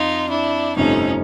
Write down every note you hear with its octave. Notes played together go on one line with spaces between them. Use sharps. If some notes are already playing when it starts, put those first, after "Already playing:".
Already playing: F2 D#4 F4
D4 E4
G1 F2 C3 F3 A3 C#4 D#4